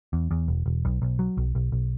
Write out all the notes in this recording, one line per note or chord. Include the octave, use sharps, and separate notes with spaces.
E2
E2
E1
E1
B1
B1
F#3
B1
B1
B1